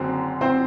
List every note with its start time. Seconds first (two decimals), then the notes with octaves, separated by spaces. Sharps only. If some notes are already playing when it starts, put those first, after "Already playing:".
Already playing: F#1 F#2 D3 C4
0.41 C4 C5